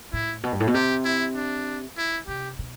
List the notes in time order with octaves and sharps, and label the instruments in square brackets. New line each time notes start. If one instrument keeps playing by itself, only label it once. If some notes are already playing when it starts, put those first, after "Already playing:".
[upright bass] A2 [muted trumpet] E4
[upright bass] B2
G2
A2
B2
[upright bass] C3 [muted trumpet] G4
[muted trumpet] E4
D4
E4
[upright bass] C3 [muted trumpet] G4
[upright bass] B2